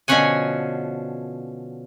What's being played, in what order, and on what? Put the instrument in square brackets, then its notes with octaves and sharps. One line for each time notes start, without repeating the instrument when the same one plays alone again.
[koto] B2 D3 F3 C#4 F#5 G#5